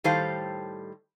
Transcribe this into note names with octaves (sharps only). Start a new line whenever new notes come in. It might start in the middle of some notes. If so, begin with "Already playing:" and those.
A2 D#3 G3 A4 C5 F5